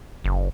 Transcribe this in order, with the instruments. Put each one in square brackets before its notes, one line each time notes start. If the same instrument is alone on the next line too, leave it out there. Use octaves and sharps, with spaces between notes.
[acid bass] F#1